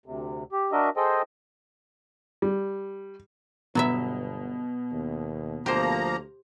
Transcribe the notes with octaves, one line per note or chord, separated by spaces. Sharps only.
D2 C3
G4
D4 F#4 A#4 D#5 E5
G#4 A4 C5 D#5 G5
G3
G1 B2 F#3 B3 E5
D#2
D2 F3 A#3 G4 C5 A#5